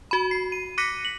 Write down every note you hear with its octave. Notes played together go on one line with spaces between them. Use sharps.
F#4 B5
C7
D#7
D6 F#6 A#6 B6 C#7 D#7
F#7